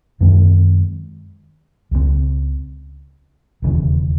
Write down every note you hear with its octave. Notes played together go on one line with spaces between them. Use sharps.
F#2 D#3 G#3 C4
C#2 C#3 F#3 C4
E1 D#2 C#3 E3